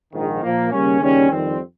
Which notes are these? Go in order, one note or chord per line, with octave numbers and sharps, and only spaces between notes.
A#1 G#2 D#3
A#2 F3 A#3
D#2 C#3 G3 A#3 C#4
D#2 C#3 G3 C#4
F2 D#3 G3 C4